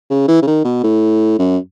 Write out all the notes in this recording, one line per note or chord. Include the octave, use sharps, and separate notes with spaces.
C#3
E3
C#3
D#3
B2
A2
F#2